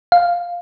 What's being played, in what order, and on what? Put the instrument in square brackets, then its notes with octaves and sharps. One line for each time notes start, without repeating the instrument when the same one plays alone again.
[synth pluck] F5